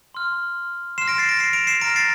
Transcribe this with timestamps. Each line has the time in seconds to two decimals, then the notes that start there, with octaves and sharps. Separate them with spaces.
0.15 C6 F6
0.98 C6 F6 C7 E7
1.08 A#6 D7
1.18 A6 C7
1.29 A#6 D7
1.39 C7 E7
1.53 D7 F7
1.67 C7 E7
1.81 A#5 F6 A#6 D7
1.96 A6 C7